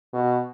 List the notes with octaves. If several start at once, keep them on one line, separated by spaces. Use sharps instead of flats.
B2